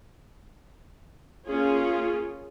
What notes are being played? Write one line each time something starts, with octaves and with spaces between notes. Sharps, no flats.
A#3 C#4 F4 G#4